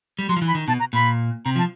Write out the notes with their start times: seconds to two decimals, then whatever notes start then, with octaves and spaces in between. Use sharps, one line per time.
0.19 G3
0.29 F#3 C6
0.37 F3
0.42 E3
0.48 B5
0.55 D#3
0.68 B2 A5
0.80 A#5
0.93 A#2 B5
1.45 C3 A#5
1.56 F3 A5